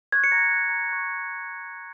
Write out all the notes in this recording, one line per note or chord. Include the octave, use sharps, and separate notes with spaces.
C#6 F#6 G#6
C#7
A#5 A#6
F#6
A#5
C#6 F#6